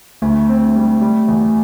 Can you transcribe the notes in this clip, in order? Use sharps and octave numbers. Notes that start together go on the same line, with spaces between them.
D2 A3
C4
G3
G3
E2